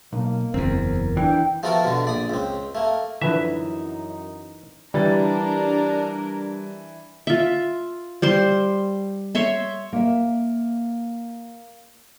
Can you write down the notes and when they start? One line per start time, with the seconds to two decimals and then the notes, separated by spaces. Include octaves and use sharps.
0.13 B1 A#3
0.54 F#1 E2 C4 A#4
1.17 E3 D4 G5
1.63 F3 A3 B3 F#4 A4 A#4
1.84 B2 D3
2.05 A#1 D5 D#6
2.29 C#2 C4
2.75 A3 A#3
3.22 F#2 D3 E3 F3 D#4 B4 E5
4.94 E3 G3 D4 A#4 A6
7.27 F4 E5
8.22 G3 C5 C6
9.35 C#5 E5 C6
9.93 A#3 E5